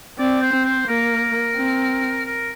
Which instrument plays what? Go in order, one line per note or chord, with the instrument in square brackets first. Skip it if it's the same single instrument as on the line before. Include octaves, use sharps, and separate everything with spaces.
[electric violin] C4 [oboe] D5
[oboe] C5
[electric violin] C4
[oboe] C5
[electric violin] A#3 [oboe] A#4
[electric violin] C4
[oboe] A#4